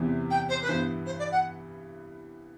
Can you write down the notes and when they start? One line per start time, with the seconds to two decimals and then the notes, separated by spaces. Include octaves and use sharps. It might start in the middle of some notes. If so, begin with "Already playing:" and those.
Already playing: E2 C3 E3
0.30 G5
0.49 C5
0.61 B4
0.68 G2 E3 B3 C5
1.05 C5
1.19 D5
1.31 F#5